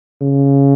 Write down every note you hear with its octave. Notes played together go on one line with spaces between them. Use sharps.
C#3